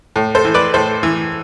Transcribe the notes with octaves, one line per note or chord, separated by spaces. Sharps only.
A2
A4 C5
E3
B4 D5
A2 A4 C5
E3